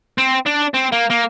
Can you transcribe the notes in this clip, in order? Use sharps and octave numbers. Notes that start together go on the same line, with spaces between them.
C4
D4
C4
A#3
A#3